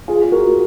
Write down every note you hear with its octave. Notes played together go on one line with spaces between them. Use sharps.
F4 G#4
G#4
F#4 A#4